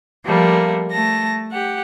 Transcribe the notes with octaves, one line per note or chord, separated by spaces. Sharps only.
F3 G3 A3 A#3
A3 A5 A#6
G4 F#5